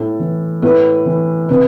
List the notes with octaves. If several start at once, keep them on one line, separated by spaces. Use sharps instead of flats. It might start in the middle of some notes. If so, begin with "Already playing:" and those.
Already playing: A2 A4
E3
A2 B4
E3
C3 B4